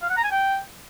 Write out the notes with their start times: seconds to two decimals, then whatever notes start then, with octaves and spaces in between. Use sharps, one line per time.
0.02 F5
0.10 F#5
0.17 A#5
0.24 G#5
0.31 G5